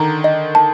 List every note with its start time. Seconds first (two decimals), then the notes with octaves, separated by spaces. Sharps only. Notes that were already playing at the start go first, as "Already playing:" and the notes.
Already playing: D3 D#3 A#5
0.24 D#5
0.55 A5